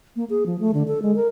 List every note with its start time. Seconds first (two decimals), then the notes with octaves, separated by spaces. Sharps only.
0.16 A#3
0.30 G#4
0.46 F3
0.60 A3
0.74 D3
0.88 A4
1.02 G#3
1.16 A#4